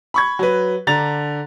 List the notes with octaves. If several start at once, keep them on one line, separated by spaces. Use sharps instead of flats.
B5 C#6 G#6
F#3 B4
D3 D4 A#5 A6 F7